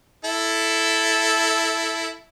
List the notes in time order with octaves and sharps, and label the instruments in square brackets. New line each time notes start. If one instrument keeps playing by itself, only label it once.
[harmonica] E4 A4